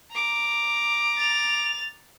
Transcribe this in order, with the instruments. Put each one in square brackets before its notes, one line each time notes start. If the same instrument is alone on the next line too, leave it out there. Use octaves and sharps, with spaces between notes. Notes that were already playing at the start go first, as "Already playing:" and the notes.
[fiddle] A#5 D6
[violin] A6 F7